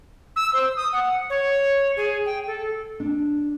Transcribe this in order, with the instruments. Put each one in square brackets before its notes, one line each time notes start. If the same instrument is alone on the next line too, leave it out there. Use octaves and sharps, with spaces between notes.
[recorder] E6
C5
D#6
F#5
C#5
G#4
G5
A4
[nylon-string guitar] D4